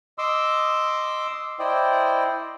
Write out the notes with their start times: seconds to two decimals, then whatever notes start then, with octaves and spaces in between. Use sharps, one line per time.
0.18 D#5 C6 D6 E6
1.59 E4 C5 D5 D#5 G5